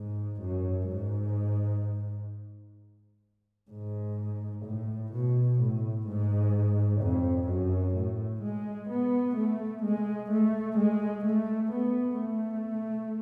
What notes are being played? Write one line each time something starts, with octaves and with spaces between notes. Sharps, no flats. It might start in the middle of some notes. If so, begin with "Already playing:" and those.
Already playing: G#2
F#2
G#2
G#2
A2
B2
A2
G#2
F2
F#2
A2
G#3
B3
A3
G#3
A3
G#3
A3
B3
A3